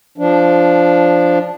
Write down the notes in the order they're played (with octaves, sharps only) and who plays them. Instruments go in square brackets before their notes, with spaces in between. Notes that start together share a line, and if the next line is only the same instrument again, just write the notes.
[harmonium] F3 D4